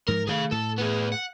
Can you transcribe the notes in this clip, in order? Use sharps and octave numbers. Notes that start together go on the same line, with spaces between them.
G#2 F3 A#4
D#3 A3 G#4 F5
A2 A4
B3 G#4
F#5